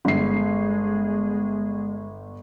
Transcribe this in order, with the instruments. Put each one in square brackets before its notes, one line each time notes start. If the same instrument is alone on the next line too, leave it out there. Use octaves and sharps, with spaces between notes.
[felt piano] G1 C7 [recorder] G#3